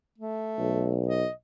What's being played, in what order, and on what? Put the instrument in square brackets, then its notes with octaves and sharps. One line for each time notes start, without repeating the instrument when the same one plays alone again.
[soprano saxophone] A3
[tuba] B1
[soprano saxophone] D#5